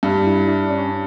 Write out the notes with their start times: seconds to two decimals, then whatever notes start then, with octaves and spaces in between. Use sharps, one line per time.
0.03 G2
0.26 E4
0.47 D4
0.70 C#4